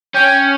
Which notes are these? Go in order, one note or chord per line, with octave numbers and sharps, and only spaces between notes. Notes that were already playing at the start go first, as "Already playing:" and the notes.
C#4 G5